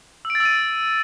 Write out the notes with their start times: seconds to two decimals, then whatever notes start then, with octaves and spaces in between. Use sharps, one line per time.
0.25 E6
0.30 D7
0.35 A6
0.40 E6
0.45 D#7